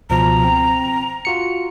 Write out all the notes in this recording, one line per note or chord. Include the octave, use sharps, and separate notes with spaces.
C#2 B2 F3 A#5
C4
F4 F#4 C#7